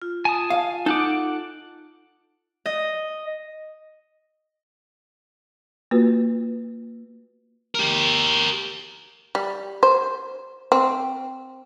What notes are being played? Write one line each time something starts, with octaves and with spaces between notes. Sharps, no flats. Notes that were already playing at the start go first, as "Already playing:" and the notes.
F4
G#5 A5 D#6
F5
D#4 A4 F#5 D6
D#5
A#3 F4 F#4 B4
G4 A#4
G3
C5
C4